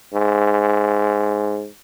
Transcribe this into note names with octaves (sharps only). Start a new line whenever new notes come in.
G#2